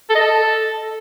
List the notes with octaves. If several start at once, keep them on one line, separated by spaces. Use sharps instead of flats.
A4
D#5
A4